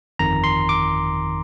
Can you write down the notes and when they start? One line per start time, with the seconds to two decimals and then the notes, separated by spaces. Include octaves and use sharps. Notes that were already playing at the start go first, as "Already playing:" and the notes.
0.19 G1 F2 D#3 A#5
0.44 C6
0.69 D6